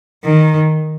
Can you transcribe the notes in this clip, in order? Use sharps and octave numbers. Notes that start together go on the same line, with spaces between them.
D#3